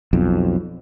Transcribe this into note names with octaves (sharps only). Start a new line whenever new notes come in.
B1 F2